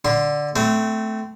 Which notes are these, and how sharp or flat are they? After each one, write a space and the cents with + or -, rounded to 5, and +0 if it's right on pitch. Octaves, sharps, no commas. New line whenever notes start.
D3 +0 C6 +0
A3 +0 C4 -25